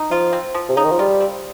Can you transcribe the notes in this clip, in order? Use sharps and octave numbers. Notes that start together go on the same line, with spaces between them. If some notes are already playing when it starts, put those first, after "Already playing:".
Already playing: D#4
F3 F4
C4
F3
C3
C#3 D#4
D#3
F3
G3 F4
C4